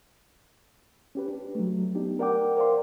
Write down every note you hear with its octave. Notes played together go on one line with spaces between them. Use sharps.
C#4 G4 B4
D4
F#3 A3
B3 D4 D#4 G4
A#4 D5 F#5 G5 D6
A#4 C5 D5 F5 C6